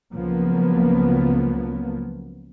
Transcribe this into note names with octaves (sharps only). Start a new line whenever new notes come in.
C#2 C#3 F3 F#3 A#3 B3